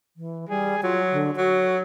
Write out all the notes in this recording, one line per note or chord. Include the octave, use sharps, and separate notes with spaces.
E3
G3 G#4
F#3 F4
D3
F#3 F#4